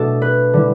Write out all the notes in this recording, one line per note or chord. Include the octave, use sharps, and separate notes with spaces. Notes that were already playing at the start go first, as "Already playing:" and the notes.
Already playing: B2 A3 D4 A4
B4
D3 G3 E4